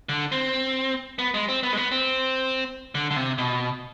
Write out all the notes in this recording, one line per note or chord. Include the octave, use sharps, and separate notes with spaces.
D3
C4
B3
G#3
C4
B3
G#3
B3
C4
D3
D3
C3
B2